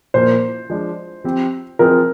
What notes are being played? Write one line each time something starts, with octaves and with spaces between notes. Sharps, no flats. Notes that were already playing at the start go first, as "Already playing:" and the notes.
A#2 F3 A#3 C5
F3 G#3 D4
F3 C4 G4
F3 C4 F4 G#4 A#4